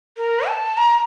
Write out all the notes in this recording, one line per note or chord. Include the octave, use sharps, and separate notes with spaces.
A#4
A5
A#5